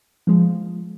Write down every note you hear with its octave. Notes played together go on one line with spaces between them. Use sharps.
F3 G#3